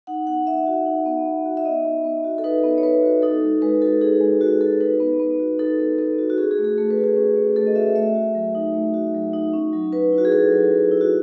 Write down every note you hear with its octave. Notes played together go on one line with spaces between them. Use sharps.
D#4 F#5
B3 F#5
B3 E5
F#4
D#4
B3
B3
F#4
E5
D#4 D#5
B3
B3
F#4
A4
D#4 B4
B3
C#5
B3 B4
F#4
D#4 A4
G#3
G#3 B4
F#4 A4
D#4 G#4
G#3
G#3 F#4
F#4 A4
D#4 B4
B3
B3
F#4
D#4 A4
B3
B3 A4
F#4
F#4
C#4 G#4
G#4
A3
G#4
A3 A4
B4
F#4
G#4
C#4
A3
A3 A4
D#5
F#4 E5
A3 E5
F#4
F#3
D#4
A3
F#4
F#3
D#4
C#4
F#3
F#3 B4
E4
F#4
G#4
C#4 A4
F#3
F#3
E4
F#4